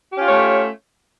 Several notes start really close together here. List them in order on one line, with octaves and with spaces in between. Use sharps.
G4 C#4 F4 C#5 A3